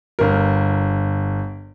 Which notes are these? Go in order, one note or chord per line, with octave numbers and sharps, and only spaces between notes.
G1 A#4